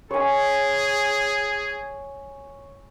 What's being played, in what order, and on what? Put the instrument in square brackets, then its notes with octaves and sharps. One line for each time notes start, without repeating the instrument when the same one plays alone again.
[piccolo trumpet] G#4 [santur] C#5 G#5